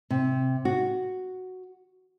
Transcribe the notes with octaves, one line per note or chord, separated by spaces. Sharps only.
C3
F#4